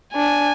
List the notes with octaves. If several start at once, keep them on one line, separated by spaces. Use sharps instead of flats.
D4 G#5